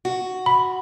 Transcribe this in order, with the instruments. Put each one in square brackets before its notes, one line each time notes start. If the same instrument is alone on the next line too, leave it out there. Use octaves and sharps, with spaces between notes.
[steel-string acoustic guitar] F#4
[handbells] B5